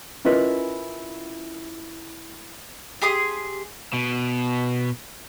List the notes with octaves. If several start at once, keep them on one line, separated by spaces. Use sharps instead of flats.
C#4 E4 F4 A#4 B4 D#5
G4 G#4 C6 D#6
B2